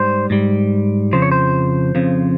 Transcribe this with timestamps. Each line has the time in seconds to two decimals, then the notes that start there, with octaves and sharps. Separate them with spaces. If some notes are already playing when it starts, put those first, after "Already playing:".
Already playing: G#2 G3 C5
0.30 G#2 G3
1.13 F2 C#3 F3 C5
1.22 C#5
1.32 C5
1.95 F2 C#3 F3